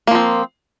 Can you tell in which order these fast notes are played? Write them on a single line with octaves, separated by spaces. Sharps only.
A#3 F3 C4